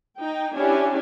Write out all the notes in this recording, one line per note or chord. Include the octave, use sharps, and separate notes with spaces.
D#4 G5
C#4 D4 E4 G4 G#5